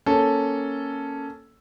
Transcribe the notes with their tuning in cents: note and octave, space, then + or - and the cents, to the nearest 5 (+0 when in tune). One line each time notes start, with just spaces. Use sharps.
A#3 +0 C#4 +0 A4 +0